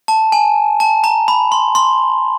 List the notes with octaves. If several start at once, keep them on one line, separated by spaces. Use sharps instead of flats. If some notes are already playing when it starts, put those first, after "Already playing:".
A5
G#5
A5
A#5
B5
C6
C6